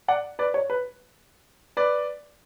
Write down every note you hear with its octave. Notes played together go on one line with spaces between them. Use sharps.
D5 F#5
B4 D5
C#5
B4
B4 D5